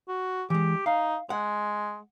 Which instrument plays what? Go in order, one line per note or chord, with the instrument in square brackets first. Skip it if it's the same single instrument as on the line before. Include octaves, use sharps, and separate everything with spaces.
[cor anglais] F#4
[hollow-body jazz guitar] E3 G#3 [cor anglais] G4
[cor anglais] D#4 [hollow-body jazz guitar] F5
[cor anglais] G#3 [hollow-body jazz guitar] F#5